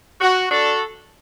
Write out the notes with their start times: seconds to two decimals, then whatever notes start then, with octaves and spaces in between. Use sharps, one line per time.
0.21 F#4
0.51 D4 F#4 A4